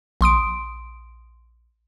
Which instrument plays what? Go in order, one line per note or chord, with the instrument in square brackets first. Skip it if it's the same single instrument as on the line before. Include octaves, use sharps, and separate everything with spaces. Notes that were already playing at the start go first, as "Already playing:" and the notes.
[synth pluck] A#1 C6 D#6 D7